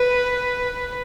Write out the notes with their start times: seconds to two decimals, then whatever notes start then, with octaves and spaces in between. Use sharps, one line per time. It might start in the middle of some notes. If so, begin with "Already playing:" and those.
Already playing: B4